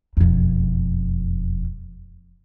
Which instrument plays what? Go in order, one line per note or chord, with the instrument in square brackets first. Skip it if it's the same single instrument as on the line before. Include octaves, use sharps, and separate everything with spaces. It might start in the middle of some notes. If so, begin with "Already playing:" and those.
[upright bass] E1 F2